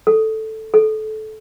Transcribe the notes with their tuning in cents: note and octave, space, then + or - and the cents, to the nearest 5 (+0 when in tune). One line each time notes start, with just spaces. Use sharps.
A4 +0
A4 -20